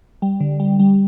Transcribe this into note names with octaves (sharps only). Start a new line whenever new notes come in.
G3
D3
G3
G3